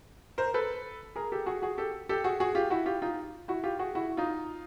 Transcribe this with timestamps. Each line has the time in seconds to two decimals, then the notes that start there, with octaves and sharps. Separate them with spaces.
0.38 A#4 C5
0.54 A4 B4
1.16 G#4 A#4
1.32 G4 A4
1.46 F#4 G#4
1.62 F#4 G#4
1.78 G4 A4
2.09 G4 A4
2.24 F#4 G#4
2.40 F#4 G#4
2.55 F4 G4
2.70 E4 F#4
2.86 F4 G4
3.02 D#4 F4
3.48 E4 F#4
3.63 F4 G4
3.79 F#4 G#4
3.95 E4 F#4
4.17 D#4 F4